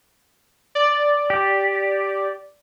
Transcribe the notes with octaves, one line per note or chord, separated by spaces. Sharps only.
D5
G4